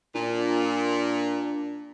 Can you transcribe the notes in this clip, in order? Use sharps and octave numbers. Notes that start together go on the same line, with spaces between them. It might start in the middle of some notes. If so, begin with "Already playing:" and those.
A#2 D4